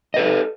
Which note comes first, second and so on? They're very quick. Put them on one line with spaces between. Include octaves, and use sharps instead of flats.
D#5 B4 A4